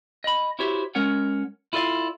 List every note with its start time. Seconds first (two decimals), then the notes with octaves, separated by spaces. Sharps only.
0.24 D#5 B5
0.59 E4 F#4 G4 C5 C#5 E5
0.95 G#3 C#4 A#4 C#5 F#5
1.73 E4 F4 A4 D5 F5